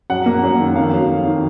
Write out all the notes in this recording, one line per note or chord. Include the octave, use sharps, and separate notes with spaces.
F#2 F#5
A#3
F#2
D#3
F2 F5
F#3
F2
D#3